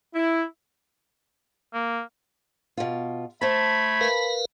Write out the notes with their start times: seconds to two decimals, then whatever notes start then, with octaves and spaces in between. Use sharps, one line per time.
0.15 E4
1.74 A#3
2.77 B2 F4
3.41 A3 C5 A5 B5 G#6
4.01 A#4 B4 F5